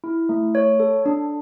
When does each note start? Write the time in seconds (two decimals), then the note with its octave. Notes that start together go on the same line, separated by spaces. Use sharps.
0.04 E4
0.29 A3
0.55 C#5
0.80 A4
1.06 D4